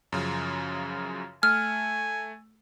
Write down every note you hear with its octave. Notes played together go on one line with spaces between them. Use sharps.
F#2 C#3 F3
A3 G#5 F6